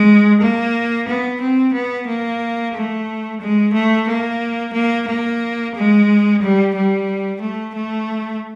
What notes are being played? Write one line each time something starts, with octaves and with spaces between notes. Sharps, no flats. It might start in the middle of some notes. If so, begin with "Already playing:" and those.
Already playing: G#3
A#3
B3
C4
B3
A#3
A3
G#3
A3
A#3
A#3
A#3
G#3
G3
G3
A3
A3